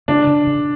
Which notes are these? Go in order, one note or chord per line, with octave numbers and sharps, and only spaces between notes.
C#3 D4
C#3
C#3